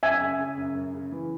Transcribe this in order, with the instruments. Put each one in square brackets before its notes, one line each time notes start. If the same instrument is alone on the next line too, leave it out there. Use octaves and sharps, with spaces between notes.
[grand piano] F#2 [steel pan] E5 G#5
[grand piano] C#3
C#3
F#2
F#2
C#3
E3